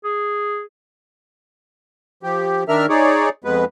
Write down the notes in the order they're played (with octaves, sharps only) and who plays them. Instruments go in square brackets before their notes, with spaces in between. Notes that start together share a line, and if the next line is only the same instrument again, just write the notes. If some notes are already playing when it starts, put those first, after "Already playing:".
[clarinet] G#4
[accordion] F3 G4
D#3 D4 A#4 E5 F6
D#4 G#4 C#5 D5
F2 G#3 B3 B4